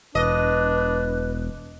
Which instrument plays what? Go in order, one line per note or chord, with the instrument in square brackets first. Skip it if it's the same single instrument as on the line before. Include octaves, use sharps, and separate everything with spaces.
[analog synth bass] E1 [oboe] D4 [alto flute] B4 [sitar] D#5